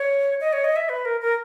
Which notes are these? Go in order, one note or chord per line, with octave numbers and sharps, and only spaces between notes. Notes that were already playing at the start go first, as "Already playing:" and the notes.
Already playing: C#5
D#5
C#5
D#5
E5
B4
A#4
A#4